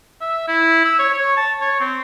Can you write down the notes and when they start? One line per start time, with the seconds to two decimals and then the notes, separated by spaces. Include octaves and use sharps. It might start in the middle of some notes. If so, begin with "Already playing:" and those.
0.21 E5
0.48 E4
0.85 E6
0.99 C#5
1.14 C#5
1.37 A5
1.61 C#5
1.80 C4